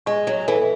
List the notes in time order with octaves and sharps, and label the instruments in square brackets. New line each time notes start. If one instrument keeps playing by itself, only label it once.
[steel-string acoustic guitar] G#3 [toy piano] C#6
[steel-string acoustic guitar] F#3
[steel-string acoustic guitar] E3 [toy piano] A4